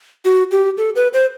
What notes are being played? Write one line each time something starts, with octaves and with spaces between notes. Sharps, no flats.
F#4
G4
A4
B4
C5